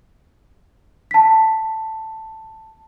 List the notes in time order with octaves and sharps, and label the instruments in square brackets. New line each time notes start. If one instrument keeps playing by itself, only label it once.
[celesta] A5 B6